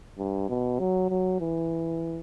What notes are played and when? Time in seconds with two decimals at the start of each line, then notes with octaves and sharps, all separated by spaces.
0.18 G2
0.49 B2
0.79 F#3
1.10 F#3
1.40 E3